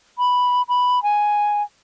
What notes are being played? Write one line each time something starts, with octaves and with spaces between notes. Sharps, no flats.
B5
B5
G#5